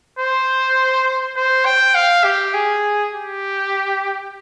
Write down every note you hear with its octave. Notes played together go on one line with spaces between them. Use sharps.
C5
C5
G5
F5
G4
G#4
G4